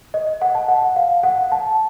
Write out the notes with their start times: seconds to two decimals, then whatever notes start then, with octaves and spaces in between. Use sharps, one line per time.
0.14 D#5
0.42 F#5
0.55 A5
0.68 F#5
0.82 F#5
0.96 F5
1.23 F#5
1.52 A5